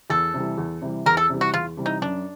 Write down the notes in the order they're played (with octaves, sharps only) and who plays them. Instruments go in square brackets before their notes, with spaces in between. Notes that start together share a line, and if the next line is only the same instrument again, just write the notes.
[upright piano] E2 [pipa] A4
[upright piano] C3 E3 G3
E2
C3 E3 G3
[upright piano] E2 [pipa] A#4
[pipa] A4
[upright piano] C3 E3 G3
[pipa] F#4
[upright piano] E2 [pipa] F4
[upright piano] C3 E3 G3
[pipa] D#4
[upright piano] F#2 [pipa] D4